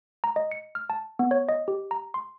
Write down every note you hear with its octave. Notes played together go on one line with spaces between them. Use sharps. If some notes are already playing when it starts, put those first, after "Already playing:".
A#5
D#5
C#7
F6
A5
B3
C#5
D#5
G4
A#5
C6